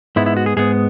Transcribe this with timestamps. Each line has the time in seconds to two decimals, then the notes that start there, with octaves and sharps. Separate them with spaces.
0.16 G#2 G#3 B3 E4
0.26 E4
0.37 F#4
0.46 G#4
0.57 G#2 G#3 B3 G#4